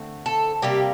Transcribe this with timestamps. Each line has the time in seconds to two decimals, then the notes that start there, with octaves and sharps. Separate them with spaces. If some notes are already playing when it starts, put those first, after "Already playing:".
Already playing: D3 A3 C4
0.26 A4
0.62 C3 G3 A#3 G4